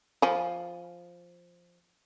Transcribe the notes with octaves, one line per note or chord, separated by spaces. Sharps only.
F3 G#5